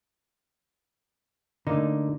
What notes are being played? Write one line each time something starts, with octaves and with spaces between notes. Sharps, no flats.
D3 A3 A#3 D#4